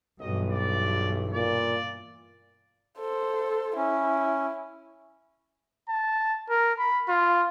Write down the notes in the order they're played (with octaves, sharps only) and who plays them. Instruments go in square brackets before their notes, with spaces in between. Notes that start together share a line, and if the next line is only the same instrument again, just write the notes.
[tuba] B1 [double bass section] G2 B2 E3 [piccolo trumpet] D#5
[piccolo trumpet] D5
[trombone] A#2 [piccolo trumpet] D5
[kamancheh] A4 C5
[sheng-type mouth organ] C#4 [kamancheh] E4
[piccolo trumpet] A5
A#4
B5
F4